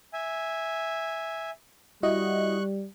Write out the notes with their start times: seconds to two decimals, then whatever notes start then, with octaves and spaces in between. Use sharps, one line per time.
0.13 E5 G#5
2.03 G3 E4 F#4 D#5 C#6 F#6